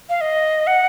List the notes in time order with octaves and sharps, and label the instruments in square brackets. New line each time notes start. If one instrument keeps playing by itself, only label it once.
[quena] F5
D#5
F#5